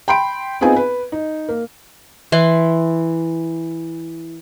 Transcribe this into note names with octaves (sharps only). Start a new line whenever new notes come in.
G5 B5 C6 D7
B3 C4 D#4 F4 G#4 G#5
B4
D#4
A#3
E3 E4 C6